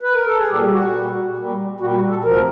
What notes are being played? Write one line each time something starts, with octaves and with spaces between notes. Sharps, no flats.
B4
A#4
A4
G#4
A#2 G3 G4
F#4
A#2 G3
A#2 G3
A#2 G3 F#4
F#4
A4
D2 C3 F3 A#4